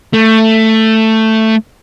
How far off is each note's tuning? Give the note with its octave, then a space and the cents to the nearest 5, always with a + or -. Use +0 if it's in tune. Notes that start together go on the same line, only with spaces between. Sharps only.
A3 +10